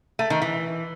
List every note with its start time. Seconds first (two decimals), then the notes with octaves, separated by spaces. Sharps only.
0.19 A3
0.30 D#3
0.42 E3